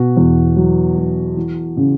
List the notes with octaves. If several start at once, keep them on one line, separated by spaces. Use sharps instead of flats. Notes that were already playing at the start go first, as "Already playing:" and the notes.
Already playing: B2 F#4
E2
F#3
F#3
E3
C#3